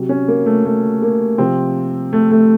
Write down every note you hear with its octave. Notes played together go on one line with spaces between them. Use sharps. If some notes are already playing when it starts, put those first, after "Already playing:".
Already playing: C3 F#3
C#4
A#3
A3
A3
A#3
C3 F3 C4
A3
A3